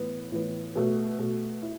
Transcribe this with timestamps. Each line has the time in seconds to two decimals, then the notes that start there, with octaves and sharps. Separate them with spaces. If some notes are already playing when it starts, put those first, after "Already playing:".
Already playing: A2 E3 B3
0.32 A2 E3 B3
0.76 B2 A3 F#4
1.19 B2 A3 F#4
1.62 E4